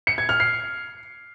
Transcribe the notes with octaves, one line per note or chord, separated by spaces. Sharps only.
C#7
G#6
F6
C7